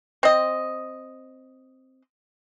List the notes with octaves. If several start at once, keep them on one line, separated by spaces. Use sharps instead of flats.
C4 D#5